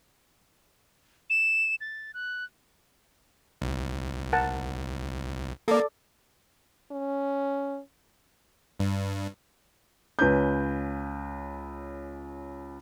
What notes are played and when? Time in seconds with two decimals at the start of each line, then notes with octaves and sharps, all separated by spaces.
1.30 E7
1.81 A6
2.14 F#6
3.61 C2
4.33 A#4 F#5 A5
5.68 A#3 A4 D5
6.92 C#4
8.80 G2
10.19 C#2 C#4 B4 G6